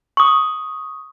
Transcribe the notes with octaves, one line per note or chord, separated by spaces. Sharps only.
C#6 D#6